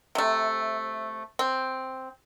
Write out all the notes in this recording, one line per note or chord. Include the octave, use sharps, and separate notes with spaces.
C3 A3
C4